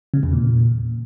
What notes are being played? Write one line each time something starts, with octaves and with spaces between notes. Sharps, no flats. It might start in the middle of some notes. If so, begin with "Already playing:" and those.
C#3
E2
A#2